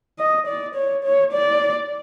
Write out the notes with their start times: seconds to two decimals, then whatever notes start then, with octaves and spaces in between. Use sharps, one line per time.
0.19 D#5
0.47 D5
0.76 C#5
1.04 C#5
1.33 D5